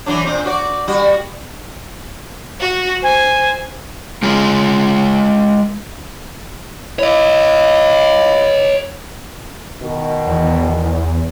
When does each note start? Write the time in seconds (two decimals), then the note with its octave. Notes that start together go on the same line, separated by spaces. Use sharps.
0.06 E3 F#3 D4
0.25 A#2 C4
0.45 F#4 D5
0.88 G3 F#4
2.60 F#4
3.03 C5 G#5
4.23 G#3 F4 G#4
6.99 E4 C#5 D#5
9.82 B2 D#3
10.27 E2